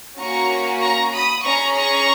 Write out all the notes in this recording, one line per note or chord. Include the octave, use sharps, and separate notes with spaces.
A#3 C#4 F#4 A#5 C#6
A#5 C#6
B5 D#6
C#4 G#4 A#5 C#6
A#5 C#6